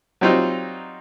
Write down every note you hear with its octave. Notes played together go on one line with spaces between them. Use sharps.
F#3 G3 C4 D#4 F4